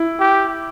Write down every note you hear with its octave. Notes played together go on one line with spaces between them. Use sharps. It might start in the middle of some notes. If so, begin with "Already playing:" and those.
Already playing: E4
G4